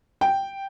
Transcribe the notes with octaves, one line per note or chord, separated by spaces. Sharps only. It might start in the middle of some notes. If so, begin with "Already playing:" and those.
G5